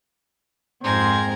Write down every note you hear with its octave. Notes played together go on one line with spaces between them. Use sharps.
F2 G#2 G#3 C4 A#4 C5 G#5